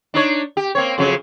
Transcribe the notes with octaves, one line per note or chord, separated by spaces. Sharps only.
D4 D#4 C#5
G4
A#3 C4 C#5
F2 C#3 F#3